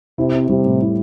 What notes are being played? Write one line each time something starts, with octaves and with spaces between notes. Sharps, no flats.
C3 E4
C4
C3 G3
A2
E4